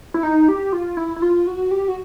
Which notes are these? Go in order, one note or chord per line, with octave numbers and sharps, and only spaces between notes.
E4
D#4
G4
F4
E4
E4
F4
F#4
G4
F#4